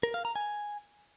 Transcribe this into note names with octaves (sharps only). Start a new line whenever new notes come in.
A#4
F5
A#5
G#5